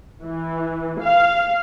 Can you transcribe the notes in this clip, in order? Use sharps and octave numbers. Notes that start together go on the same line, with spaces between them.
E3
F5